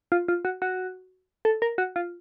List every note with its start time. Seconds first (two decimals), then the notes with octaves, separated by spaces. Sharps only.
0.12 F4
0.28 F4
0.45 F#4
0.62 F#4
1.45 A4
1.62 A#4
1.78 F#4
1.96 F4